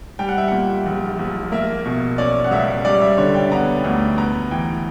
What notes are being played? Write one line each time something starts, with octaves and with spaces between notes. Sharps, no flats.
G3 G5
F#5
E5
A#2 F#5
A#1
A#1
A#3 E5
B2
C#4 D5
F#5
C#2 E5
G3 D5
E5
D3 C#5
G5
B3 A#5
D2
B3 A#5
E3 G5